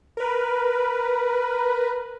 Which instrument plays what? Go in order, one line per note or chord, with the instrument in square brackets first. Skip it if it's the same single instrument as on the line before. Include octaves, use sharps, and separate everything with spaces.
[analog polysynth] A#4 B4